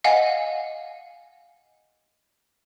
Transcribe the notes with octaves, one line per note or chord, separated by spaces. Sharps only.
D#5 F5 F#5 G#5